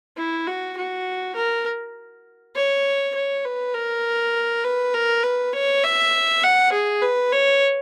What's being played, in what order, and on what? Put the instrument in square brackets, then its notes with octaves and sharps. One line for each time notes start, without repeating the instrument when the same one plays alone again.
[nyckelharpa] E4
F#4
F#4
A#4
C#5
C#5
B4
A#4
B4
A#4
B4
C#5
E5
F#5
G#4
B4
C#5